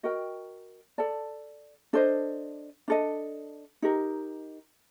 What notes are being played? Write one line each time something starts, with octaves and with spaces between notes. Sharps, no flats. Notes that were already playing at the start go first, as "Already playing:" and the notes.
F#4 A#4 D#5 G5
A4 D5 A5
D4 A4 C5 D#5
D4 A4 D#5
D#4 G4 A#4